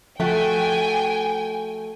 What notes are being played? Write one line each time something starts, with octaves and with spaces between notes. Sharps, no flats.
F3 A3 F#4 G5 G#5